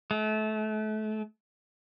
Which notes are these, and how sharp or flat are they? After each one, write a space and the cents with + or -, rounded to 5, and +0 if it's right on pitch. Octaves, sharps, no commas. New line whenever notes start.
A3 -30